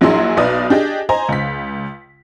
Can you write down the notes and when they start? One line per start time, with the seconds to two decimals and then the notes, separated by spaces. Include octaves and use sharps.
0.01 A#1 F#3 D4 E4 G#4 C6
0.37 B1 B4 D5 D#6
0.70 D4 G4 G#4 D#5
1.09 C5 D#5 G#5 A#5
1.29 C#2 B6